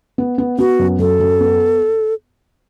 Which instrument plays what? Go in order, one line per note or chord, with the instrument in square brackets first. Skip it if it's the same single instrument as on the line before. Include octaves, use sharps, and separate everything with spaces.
[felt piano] B3
B3
[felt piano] B3 [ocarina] F#4
[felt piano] F#2
[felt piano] F#2 [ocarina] A4
[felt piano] F#2
B3